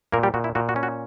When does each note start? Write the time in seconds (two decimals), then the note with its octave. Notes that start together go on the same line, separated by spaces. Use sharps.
0.12 A#2 A#3 A#4
0.23 G3 G4
0.34 A#2 F#4
0.44 E4
0.55 A#2 F#4
0.69 F#4
0.76 C#4
0.83 F#4